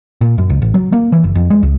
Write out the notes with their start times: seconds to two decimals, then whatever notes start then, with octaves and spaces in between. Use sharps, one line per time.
0.21 A#2
0.38 F#2
0.50 C#2
0.62 A1
0.74 F#3
0.92 A#3
1.12 E3
1.24 F#1
1.35 F2
1.50 G#3
1.63 C#2